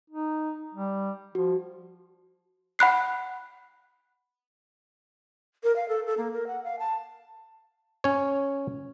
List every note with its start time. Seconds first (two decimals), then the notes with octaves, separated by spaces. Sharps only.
0.10 D#4
0.74 G3
1.35 F3 F#4
2.79 F#5 B5 F#6 C7
5.64 A#4
5.76 F5
5.89 A4
6.06 A4
6.18 A#3
6.34 A#4
6.47 F#5
6.64 F5
6.79 A5
8.04 C#4 C#5